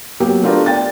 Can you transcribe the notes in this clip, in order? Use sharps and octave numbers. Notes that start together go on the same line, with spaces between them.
F#3 A#3 B3 G4
A3 B3 D4 F4 G4 A#4
D5 G5 A6